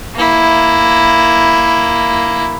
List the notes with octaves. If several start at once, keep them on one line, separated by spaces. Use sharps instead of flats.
A#3 E4